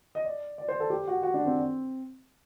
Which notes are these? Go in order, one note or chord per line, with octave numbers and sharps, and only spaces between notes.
D#5
D5
D5
C5
A4
G4
F#4
F#4
D4
C4